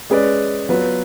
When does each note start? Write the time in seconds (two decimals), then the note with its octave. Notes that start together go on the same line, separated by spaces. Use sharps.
0.10 G#3 C#4 G#4 B4 D5
0.69 F#3 B3 F4 B4